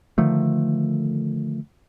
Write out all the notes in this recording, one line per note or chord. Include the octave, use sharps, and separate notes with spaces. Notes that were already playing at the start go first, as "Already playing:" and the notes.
D3 D#3 F3 A3